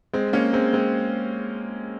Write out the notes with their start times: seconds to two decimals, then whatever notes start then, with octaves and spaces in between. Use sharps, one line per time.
0.14 G#3 C4
0.33 A#3 C#4
0.53 G#3 C4
0.73 G#3 C4